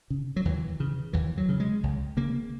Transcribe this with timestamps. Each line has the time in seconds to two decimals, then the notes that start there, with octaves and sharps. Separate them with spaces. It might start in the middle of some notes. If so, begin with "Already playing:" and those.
0.10 C#3
0.36 F#3
0.45 D#2 E3
0.80 C#3
1.13 D#2 E3
1.37 F#3
1.49 C#3
1.60 G#3
1.83 C#2
2.17 C#3 A#3